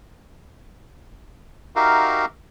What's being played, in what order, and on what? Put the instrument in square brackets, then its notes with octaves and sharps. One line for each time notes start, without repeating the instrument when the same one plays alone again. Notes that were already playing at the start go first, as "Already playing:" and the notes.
[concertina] D#4 F#4 G4 A#4 E5 F5